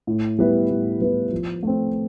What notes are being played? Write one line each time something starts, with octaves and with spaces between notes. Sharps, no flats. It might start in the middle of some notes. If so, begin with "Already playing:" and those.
A2
G3 B3 E4 B4
A2
G3 B3 E4 B4
F3
A3 C4